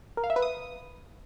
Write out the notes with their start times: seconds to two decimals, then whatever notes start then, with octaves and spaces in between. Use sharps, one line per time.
0.17 A#4
0.24 F5
0.30 E5
0.36 B4
0.42 D#6